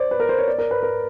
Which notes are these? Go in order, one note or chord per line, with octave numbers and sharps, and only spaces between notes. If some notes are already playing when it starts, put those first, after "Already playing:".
Already playing: C5 D5
B4
A#4
C5
C#5
D5
A#4
B4
A#4